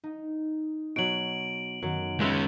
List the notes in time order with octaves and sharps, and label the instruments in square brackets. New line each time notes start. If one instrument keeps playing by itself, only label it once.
[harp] D#4
[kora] B2 F#3 [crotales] D7 F#7
[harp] F#2 D#3 [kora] F#3
[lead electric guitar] G#3 C#4 [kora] F4 B4 E5